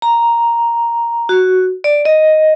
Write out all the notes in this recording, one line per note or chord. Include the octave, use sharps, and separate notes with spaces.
A#5
F#4
D5
D#5